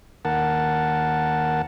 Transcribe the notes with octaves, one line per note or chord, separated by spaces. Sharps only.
D#2 A#4 F#5 A5